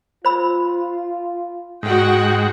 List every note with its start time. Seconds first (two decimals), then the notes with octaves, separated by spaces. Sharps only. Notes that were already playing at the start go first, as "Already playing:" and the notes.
0.25 F4 C5 B5 E6
1.83 G#2 F#4 F#5 G5